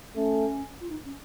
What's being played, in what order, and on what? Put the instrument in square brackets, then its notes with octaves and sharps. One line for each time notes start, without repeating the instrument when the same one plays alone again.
[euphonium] A3 [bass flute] C#4
[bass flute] F4
D#4
C#4